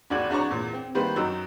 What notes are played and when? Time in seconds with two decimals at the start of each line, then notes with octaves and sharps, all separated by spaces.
0.10 E1 D#2 F#4 D5 G#6 F#7
0.30 E2 D4 F#4 C#5 A#5 C#6
0.50 E2 A#2
0.73 C4
0.95 D#3 G3 A#3 B3 B4 C5
1.16 F#2 F#3 D#4 E6